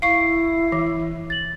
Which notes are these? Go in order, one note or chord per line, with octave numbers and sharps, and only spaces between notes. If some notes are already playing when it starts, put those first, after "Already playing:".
E4 F5 C#6 C7
E3
A6 F#7